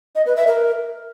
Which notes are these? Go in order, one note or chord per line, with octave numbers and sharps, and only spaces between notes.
D#5
B4
E5
A#4